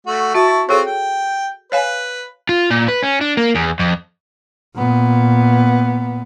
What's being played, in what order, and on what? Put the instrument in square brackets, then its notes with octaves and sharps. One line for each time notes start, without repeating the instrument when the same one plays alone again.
[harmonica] A3 F#4
[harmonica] E4 A5 C#6 [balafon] F#4
[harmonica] C4 F4 C#6 [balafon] G#4 A4 C#5
[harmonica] G5
[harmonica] B4 [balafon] C#5 F5 G#5
[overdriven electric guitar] F4
A#2
B4
C#4
D4
A#3
E2
F2
[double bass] A#2 B3